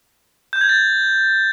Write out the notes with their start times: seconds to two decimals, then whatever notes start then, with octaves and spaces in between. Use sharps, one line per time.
0.53 G6
0.61 G#6
0.69 A6